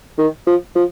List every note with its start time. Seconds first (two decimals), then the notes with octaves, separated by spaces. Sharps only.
0.18 D#3
0.47 F3
0.75 F3